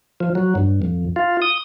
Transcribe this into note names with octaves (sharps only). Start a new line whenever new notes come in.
F3
F#3
G2
F2
F4
D#6